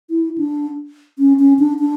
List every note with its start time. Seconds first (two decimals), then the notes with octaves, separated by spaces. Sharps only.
0.10 E4
0.38 D4
1.19 C#4
1.39 C#4
1.59 D4
1.80 D4